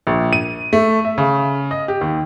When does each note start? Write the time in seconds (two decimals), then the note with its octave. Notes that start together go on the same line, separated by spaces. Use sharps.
0.07 A#1
0.33 D#7
0.73 A3
1.05 E5
1.18 C#3
1.71 D#5
1.88 G4
2.01 D#2